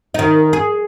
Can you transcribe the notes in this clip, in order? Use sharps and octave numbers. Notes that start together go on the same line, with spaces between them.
D#3 D#4
G#4